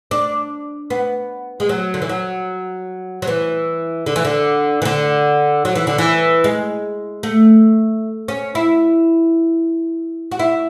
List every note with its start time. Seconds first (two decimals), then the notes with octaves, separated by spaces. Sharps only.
0.11 D4
0.90 B3
1.60 G#3
1.69 F#3
1.94 D3
2.02 E3
2.09 F#3
3.22 F#3
3.27 E3
4.06 D3
4.16 E3
4.25 D3
4.82 E3
4.85 D3
5.65 F#3
5.75 E3
5.87 D3
5.98 E3
6.44 G#3
7.23 A3
8.28 C#4
8.55 E4
10.32 F#4
10.39 E4